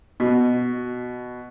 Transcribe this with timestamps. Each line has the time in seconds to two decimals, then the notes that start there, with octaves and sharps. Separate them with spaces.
0.20 B2